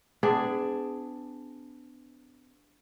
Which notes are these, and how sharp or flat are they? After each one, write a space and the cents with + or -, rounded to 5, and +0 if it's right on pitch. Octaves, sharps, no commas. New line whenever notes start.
B3 +40 D4 +0 G#4 +0